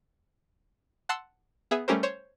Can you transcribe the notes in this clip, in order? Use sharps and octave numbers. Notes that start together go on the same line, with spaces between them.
F#5 A5 C6 E6
B3 G#4 E5
G3 A3 C#4 G4 A#4 C5
C5 C#5